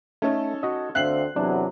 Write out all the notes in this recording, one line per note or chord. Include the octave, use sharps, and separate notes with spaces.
A3 C#4 D#4 A4
F#4 D#5
D2 D3 C4 E5 F5 F#6 C7 F#7
E2 C3 F#3 D4